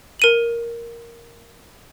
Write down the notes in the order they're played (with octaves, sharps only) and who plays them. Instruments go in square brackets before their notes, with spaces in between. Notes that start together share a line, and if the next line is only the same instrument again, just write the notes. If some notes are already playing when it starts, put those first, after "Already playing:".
[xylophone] A#4 D#7 F#7